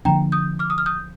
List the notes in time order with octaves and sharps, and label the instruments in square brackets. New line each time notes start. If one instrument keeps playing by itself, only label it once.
[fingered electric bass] D3 F3 A#3 D4 [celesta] G5 A#5
[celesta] D#6 G6
D6 F6
D#6
F6
D#6 G6